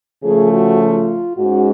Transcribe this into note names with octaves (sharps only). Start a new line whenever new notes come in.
C#3 F3 A3 G#4
F#4
F4
G#2 G#3 C#4 F#4